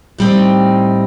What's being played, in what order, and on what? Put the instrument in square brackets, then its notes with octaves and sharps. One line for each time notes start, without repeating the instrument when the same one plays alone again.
[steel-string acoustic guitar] A2 G3 C4 D#4